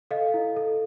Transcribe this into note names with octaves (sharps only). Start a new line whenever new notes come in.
A4 D#5 F5
E4
A4